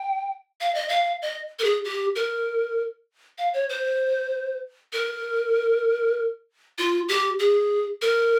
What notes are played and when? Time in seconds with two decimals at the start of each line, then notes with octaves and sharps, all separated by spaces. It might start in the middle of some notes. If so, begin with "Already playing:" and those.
Already playing: G5
0.61 F5
0.75 D#5
0.89 F5
1.22 D#5
1.59 A#4
1.64 G#4
1.85 G4
2.16 A#4
3.38 F5
3.54 C#5
3.69 C5
4.93 A#4
6.78 F4
7.09 G4
7.39 G#4
8.02 A#4